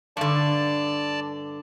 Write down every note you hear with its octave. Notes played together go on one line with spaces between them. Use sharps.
G2 D3 D5 A5